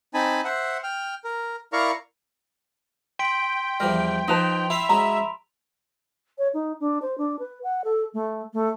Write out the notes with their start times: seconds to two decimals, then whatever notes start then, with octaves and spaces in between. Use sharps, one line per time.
0.14 C4 D#4 G#5 A5 B5
0.44 C5 E5 F#5
0.83 G5 F6
1.24 A#4
1.73 E4 A#4 D5 F5 A#5 C#6
3.19 G5 C6 B6 D7
3.80 E2 F3 G3 A#4
4.28 F3 D#4 B4 A5 C6 F7
4.70 E4 E5 F5 G5 B5 F7
4.89 F#3 G#3 C#4 A#5
6.38 C#5
6.54 D#4
6.80 D4
7.02 C5
7.18 D4
7.39 B4
7.63 F#5
7.84 A4
8.14 A3
8.54 A3